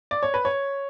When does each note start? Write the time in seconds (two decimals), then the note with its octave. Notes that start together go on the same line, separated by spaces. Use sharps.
0.11 D5
0.23 C#5
0.34 B4
0.45 C#5